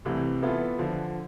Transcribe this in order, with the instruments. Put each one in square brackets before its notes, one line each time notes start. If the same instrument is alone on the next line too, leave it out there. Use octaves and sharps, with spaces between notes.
[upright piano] C2 C3 E3 A3
E3 B3 F4 A4 E5
D3 F3